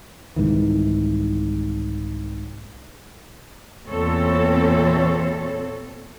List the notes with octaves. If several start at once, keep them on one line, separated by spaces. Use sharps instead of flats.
C2 G#2 D#3 E3
E2 A#2 E3 C4 A4 C#5